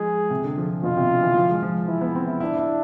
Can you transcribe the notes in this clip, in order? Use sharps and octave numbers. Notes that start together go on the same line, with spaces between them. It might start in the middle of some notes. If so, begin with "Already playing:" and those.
Already playing: F3 G#3 G#4
C3
D3
F3
D3
B2 F4
C3
D3
E3
F3
G#3
F3
E3 E4
B3
C4
E4
D4 E4
E4